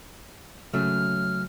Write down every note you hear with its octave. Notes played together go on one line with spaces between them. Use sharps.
C#3 F#3 A3 F6